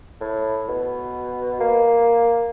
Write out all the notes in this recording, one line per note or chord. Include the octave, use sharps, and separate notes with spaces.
A2
B2
A#3